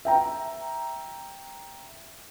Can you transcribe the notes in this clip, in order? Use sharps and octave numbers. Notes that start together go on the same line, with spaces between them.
E5 G5 A#5